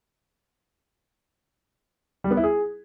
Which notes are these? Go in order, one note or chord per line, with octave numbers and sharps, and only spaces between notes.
G3
B3
E4
G#4